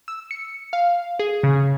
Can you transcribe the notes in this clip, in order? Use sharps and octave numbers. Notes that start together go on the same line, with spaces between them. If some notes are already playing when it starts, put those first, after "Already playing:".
E6
C#7
F5
G#4
C#3